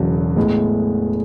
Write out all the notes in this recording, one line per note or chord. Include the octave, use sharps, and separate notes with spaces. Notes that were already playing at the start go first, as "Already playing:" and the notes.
Already playing: E1 E2 C#3 F#3
A2 G#3 B3